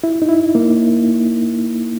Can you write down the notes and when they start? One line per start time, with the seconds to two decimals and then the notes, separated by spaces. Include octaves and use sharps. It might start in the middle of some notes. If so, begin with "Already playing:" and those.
0.04 E4
0.22 D#4
0.29 E4
0.55 A#3